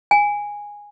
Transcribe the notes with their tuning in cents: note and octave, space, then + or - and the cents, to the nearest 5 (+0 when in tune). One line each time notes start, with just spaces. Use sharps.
G#5 -10